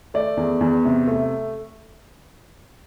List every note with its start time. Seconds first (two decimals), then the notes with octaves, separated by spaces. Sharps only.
0.14 A3 D5
0.37 E2
0.61 E2
0.85 C3
1.07 A3